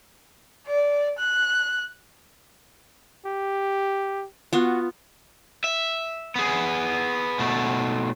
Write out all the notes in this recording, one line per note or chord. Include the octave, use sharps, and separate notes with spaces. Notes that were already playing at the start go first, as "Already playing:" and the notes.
D5
F#6
G4
B3 F4 F#4
E5
B3 G#4
B2 A3